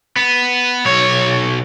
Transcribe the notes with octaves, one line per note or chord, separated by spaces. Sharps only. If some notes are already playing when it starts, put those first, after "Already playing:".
B3
B1 C#5